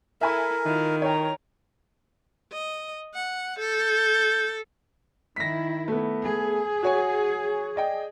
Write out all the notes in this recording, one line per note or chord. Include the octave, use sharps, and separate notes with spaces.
E4 A4 A#4 E5 G#5 B5
D#3 E4 F4
A#4 C#5 G5 A#5
D#5
F#5
A4 G6
D#3 E4 A#6 B6
A3 B3
G#4
F#4 C#5 G#5
D5 D#5 G5